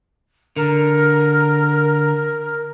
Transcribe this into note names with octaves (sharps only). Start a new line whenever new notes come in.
D3 A#4